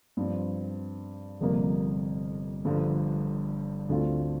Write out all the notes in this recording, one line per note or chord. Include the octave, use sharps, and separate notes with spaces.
G2 F3 C4
G1 F2 C3 G3 A#3
G1 G2 D3 F3
D2 D3 A3 C4 F4